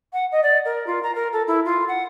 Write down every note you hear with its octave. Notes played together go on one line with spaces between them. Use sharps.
F#5
D#5
D5
A#4
F4
A#5
A#4
A4
E4
F4
F#5